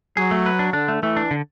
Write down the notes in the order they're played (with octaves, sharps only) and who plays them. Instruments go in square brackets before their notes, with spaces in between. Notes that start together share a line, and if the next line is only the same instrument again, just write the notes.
[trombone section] F#3 [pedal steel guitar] G#4
[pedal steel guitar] A3
B4
D4
[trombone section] D3 [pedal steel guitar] D4
[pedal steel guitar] A3
[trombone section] E3 [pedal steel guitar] A3
[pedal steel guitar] D4
D3